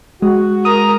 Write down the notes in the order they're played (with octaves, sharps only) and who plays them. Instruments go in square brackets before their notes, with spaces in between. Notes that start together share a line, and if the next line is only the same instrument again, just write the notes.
[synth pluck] G#3 [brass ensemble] F#4
[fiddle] A#4 A#5 [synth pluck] D#6